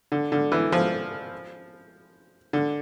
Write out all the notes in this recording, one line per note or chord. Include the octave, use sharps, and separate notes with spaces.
D3
D3
E3
F3
D3